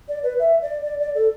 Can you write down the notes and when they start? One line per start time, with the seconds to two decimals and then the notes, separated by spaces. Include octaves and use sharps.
0.08 D5
0.23 B4
0.39 E5
0.62 D5
0.84 D5
1.00 D5
1.15 A4